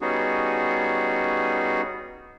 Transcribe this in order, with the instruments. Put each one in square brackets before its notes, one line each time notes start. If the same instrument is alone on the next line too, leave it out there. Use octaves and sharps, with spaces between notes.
[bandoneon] G3 B3 C#4 D#4 F#4 G#4